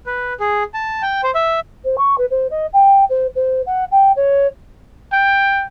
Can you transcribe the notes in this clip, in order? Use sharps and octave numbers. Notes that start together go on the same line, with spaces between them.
B4
G#4
A5
G5
C5
E5
C5
C#6
B4
C5
D#5
G5
C5
C5
F#5
G5
C#5
G5